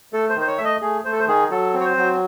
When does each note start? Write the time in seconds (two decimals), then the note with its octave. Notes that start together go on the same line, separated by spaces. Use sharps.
0.13 A3 A4
0.30 C5
0.36 D#3
0.41 C5
0.47 C#5
0.58 A3 E5
0.64 D#5
0.82 A3 G#4
1.05 A3 C5
1.12 A4
1.20 C5
1.28 D#3 G#4
1.50 F#3 A4
1.74 C4
1.80 C#5
1.85 C5
1.97 F#3